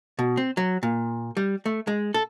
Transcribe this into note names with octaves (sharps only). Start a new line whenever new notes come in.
B2
C4
F#3
A#2
G3
A3
G#3
A4